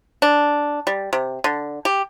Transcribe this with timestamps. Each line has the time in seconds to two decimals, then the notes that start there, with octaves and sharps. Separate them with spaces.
0.22 D4
0.87 G3
1.13 C3
1.44 D3
1.85 G4